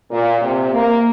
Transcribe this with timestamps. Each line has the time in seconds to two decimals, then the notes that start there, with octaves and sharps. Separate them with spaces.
0.11 A#2
0.41 C3
0.72 A#3